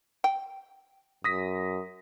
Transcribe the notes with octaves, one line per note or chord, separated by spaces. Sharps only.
G5
F#2 D#6 A#6 B6